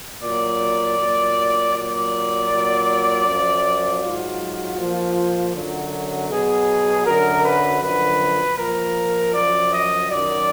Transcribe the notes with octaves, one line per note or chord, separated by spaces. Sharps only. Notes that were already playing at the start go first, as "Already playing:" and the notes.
A#2 F#3 D5
A#2 F#3
A#2 F#3 D5
A#2 F#3
F#2 F3
G#2 F#3 F4
A#2 F3
F#2 D3 F#3
B2 F#3 G#4
F#2 D3 F#3 A#4
B4
F#2 D3 F3 B4
A#2 F3 A#4
F#2 F3 D5
D#5
F#2 D#3 F#3 D5